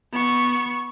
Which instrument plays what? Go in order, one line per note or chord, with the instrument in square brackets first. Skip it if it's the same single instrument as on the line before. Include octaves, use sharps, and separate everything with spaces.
[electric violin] B3 C#6